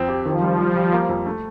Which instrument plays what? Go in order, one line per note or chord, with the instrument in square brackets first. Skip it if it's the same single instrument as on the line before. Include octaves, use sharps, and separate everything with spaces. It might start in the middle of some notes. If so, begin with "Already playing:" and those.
Already playing: [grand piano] F2 C4
G4
[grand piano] D#3 [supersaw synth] F3
[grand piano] G3
G3
G3
A#3
F2
A3